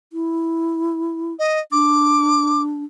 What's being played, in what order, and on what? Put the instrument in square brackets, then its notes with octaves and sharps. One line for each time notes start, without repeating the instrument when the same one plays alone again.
[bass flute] E4
[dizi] D#5
[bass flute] D4 [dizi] D6